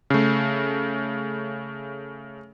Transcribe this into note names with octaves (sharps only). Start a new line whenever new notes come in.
C#3 A3